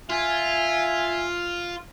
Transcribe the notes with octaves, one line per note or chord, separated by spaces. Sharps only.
F4 E5 G#5